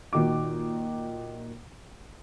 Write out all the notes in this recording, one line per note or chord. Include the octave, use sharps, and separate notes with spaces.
A#2 D#3 F#4 D6